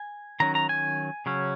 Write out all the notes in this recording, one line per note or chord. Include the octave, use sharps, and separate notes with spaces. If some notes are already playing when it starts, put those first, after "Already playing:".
Already playing: G#5
D#3 F#3 C#4 A#5
A#5
G#5
C#3 F#3 C#4